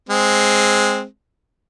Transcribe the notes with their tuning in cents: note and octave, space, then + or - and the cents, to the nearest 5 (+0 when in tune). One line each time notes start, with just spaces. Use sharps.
G#3 +0 C4 +0